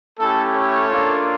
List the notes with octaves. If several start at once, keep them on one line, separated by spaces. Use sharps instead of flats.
A3 C#4 E4 G4 A4
A4 C#5
A#3 D4 F4